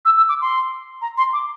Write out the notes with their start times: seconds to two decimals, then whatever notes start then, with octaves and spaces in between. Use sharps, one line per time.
0.05 E6
0.17 E6
0.29 D6
0.41 C6
1.02 A#5
1.17 C6
1.33 D6